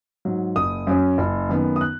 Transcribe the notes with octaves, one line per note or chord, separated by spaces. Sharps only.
G#2 F#3
F#1 D#6
F#2 F#3 C#4
F#1
F#2 D#3 B3
D#6
F#6